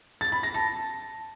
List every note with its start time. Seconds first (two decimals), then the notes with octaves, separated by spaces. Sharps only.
0.21 A6
0.32 B5
0.43 A#6
0.54 A5